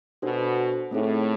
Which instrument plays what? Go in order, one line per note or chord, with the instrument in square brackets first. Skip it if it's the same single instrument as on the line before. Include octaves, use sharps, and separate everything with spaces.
[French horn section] B2 [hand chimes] D4 F#4 A4 C5
[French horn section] A2 [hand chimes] A3 C4 D#4 G#4